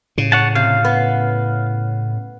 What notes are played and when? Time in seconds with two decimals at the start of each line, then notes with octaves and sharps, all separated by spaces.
0.18 A2 C#3
0.32 C#5 F#5 A5
0.55 C3 F5
0.85 B3